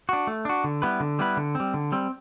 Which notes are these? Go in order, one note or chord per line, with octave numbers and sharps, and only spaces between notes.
D4 F#4
A3
D4 F#4
D3
G3 B3 E4 B4
D3
G3 B3 E4 B4
D3
G3 C4
D3
G3 C4